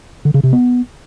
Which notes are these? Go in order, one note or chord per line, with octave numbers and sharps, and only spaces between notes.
D3
C#3
C3
B3